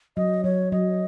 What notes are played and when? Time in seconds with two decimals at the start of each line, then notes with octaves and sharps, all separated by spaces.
0.17 F#3 D#5
0.44 F#3 C#5
0.72 F#3 D#5